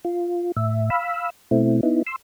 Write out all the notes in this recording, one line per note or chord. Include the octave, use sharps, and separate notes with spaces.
F4
A2 E5
F5 B5 E6
B2 A3 C4 E4
B3 D#4 E4
C6 E6